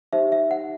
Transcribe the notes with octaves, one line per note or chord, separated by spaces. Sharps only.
D#4 G4 C5 E5
E5
F#5